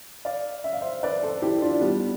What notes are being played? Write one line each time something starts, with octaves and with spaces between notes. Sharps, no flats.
D5 F5
E5
F5
C5 E5
B4 D5
A4 C5
E4 G4
D4 F4
G3 B3